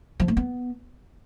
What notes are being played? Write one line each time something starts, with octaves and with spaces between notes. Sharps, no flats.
F3
A3
B3